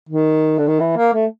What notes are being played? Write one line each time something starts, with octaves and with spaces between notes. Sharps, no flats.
D#3
D3
D#3
E3
A#3
A3